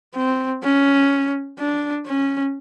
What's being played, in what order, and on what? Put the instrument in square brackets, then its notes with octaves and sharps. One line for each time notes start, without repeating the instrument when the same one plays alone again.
[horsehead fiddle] C4
C#4
D4
C#4